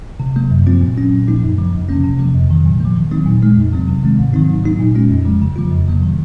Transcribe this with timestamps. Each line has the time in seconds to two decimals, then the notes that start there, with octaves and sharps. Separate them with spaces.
0.20 C3
0.36 F#3 A#3
0.51 F#2
0.67 F3 C4 F4
0.81 A#2
0.97 F#3 C#4
1.11 A#2
1.27 F3 A#3 D#4
1.43 F#2
1.58 C#3 F3
1.73 F2
1.89 C3 F3 A#3 C#4
2.04 C3
2.19 F3 A#3
2.35 F2
2.50 C3 D#3 F#3
2.65 A#2
2.80 F3 A#3
2.96 D#3
3.11 F#3 C4 D#4
3.26 A#2
3.42 G#3 D#4
3.57 F2
3.72 C3 F#3 C4
3.88 C3
4.03 D#3 G#3 C4
4.19 G#2
4.33 D#3 F#3 C4 D#4
4.48 G#2
4.64 F#3 A#3 D#4
4.80 A#2
4.95 G#3 C#4 F4
5.10 F2
5.25 C#3 F3 G#3
5.42 C#3
5.56 F3 A#3 F4
5.71 F2
5.87 C3 F#3 A#3
6.03 D#3